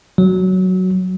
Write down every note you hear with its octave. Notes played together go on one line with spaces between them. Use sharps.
F#3